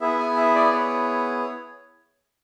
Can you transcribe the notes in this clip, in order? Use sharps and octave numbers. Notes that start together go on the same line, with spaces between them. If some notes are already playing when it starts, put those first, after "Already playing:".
B3 E4 G#4 E5
G#5
E5
D5
C#5